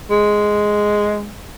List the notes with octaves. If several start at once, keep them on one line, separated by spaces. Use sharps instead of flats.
G#3